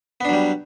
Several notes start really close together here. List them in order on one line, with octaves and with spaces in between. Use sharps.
B3 D4 F#3 G3